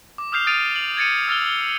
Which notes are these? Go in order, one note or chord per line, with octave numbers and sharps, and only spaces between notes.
D6
D#6 F6 G6 C7 F7
D#6 F6 A6 D7 D#7
F#7
G#6 A6 C#7 D#7
E6 F6 A6 F7 G7